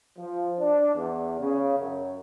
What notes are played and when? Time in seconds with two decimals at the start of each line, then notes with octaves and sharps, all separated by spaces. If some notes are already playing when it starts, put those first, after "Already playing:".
0.16 F3
0.58 D4
0.95 E2
1.39 C#3
1.78 F#2